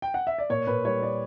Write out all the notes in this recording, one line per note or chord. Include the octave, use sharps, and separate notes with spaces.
G5
F#5
E5
D5
A#2 C#5
A#2 B4
G3 C#5
A#2 D5